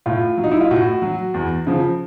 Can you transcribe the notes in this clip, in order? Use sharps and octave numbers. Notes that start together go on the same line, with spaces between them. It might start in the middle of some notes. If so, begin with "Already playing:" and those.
A2 F4
F#3
D#4
E4
F4
A2 F#4
F#3
E2
C#3 F3